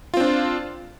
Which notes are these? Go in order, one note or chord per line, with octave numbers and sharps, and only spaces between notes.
C4 D4 F4